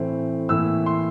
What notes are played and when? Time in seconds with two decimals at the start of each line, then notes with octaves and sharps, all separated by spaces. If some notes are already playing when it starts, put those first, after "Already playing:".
Already playing: A2 E3 A3 C4
0.49 A2 E3 A#3 E6
0.86 C6